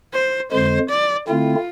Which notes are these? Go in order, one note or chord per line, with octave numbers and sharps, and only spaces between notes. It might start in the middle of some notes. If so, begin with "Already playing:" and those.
C5
F2 D3 G#3 C5
D5
D3 A3 C4 E4 F4